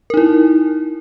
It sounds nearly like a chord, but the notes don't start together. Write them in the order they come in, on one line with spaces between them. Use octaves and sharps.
A#4 D#4 E4